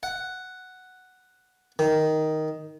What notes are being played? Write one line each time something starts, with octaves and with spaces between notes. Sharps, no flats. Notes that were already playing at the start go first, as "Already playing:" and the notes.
F#5
D#3